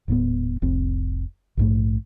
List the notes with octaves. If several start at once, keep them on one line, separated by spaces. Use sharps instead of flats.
D#1 A2 A#3 B3
F1 C2 C4
A#1 G#2 A3